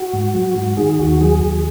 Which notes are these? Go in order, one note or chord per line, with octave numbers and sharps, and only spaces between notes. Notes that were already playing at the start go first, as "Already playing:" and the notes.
Already playing: F#4
G#2
F#3
G#2
D#3 G#4
D#2 F#4
F#3 G#4
D#2